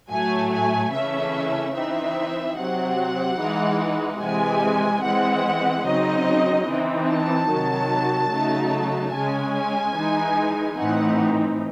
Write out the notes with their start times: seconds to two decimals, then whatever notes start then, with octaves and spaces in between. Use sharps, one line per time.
0.10 A2 F#3 A3 G#5
0.52 G#5
0.93 C#3 E3 A3 C#4 E5
1.75 E3 C4 D#4 E5
2.57 C3 F#3 C4 F#5
3.39 E3 G#3 D#4
4.21 C3 E3 G#3 G#5
5.03 E3 G#3 C4 F#5
5.86 C#3 F#3 C4 D#4 D#5
6.68 E3 C4 D#4
7.09 A5
7.50 C3 D#3 F#3
8.32 C#3 F#3 A3 D#4
9.14 C#3 G#3 C#4 G#5
9.96 E3 G#3 D#4
10.78 A2 E3 C4 D#4 F#5